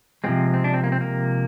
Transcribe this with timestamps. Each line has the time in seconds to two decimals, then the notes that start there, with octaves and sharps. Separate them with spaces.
0.24 C3 F3 G#3 C4
0.54 C4
0.64 D4
0.74 C4
0.84 A#3
0.92 C4
1.01 A#3